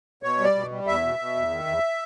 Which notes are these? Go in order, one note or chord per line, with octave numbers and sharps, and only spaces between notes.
B2 C#5
G3
D5
B2
G3
E2 E5
B2
B2
E2
D#3
E2